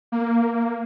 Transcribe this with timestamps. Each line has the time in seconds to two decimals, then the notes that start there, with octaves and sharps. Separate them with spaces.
0.12 A#3
0.54 A#3